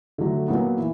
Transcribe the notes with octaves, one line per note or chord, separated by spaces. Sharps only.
D3 F#3 A3
A#2 F#3 B3
E3